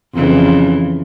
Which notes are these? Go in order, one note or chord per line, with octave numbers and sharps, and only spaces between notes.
F2 C#3 E3